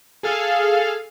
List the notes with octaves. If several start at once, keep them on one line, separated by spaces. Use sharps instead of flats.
G#4 A4 F5